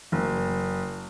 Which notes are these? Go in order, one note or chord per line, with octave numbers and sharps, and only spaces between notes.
F#1